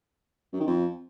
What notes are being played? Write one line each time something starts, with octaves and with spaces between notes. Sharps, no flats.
F#2
D#3
F2